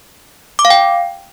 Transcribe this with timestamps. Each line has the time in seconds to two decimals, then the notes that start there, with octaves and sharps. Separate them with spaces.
0.59 D6
0.65 F5
0.70 G5